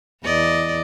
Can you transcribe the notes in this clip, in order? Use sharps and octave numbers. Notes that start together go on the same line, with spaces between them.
E2 D5 D#5